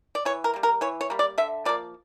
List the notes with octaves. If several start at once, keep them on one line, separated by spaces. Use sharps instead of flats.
D5
E3 C#5
A#4
G3 A#3
A#4
E3 C#5
C#5
G3 A#3
D5
D3 E5
F3 A#3 D5